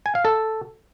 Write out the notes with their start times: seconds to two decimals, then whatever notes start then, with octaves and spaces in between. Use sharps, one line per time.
0.06 G#5
0.15 F5
0.25 A4